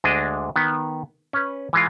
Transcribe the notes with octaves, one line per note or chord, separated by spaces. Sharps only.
D2 G#3 D4 D#5
D#3 B3
C#4 B4
E3 G#3 F4